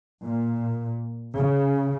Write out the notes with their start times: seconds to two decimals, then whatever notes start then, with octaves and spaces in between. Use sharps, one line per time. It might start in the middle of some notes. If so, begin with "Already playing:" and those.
0.24 A#2
1.36 C#3